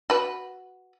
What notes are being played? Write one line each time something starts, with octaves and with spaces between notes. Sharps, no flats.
F#4 B4